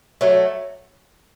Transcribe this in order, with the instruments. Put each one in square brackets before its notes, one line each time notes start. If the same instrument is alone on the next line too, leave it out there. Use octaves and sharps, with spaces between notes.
[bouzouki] F#3 A3